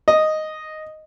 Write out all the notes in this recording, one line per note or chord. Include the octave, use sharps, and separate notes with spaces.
D#5